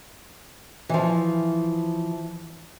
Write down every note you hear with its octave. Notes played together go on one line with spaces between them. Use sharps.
E3 F3